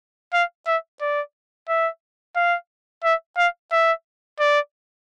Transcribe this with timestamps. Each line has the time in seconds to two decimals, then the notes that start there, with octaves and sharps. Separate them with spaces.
0.33 F5
0.67 E5
1.01 D5
1.69 E5
2.36 F5
3.04 E5
3.38 F5
3.72 E5
4.39 D5